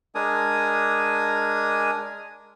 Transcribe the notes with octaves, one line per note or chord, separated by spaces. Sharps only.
G#3 D4 A#4 G#5 D#6